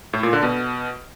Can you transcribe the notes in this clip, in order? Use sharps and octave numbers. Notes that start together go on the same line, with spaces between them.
A2
A#2
D3
B2